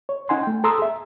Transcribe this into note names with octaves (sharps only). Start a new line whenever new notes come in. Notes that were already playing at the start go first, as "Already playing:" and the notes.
C#5
C#4 D#4 F#5 G#5 C6
A3 G5
A4 A#5 C6 D#6 E6
G#4 E5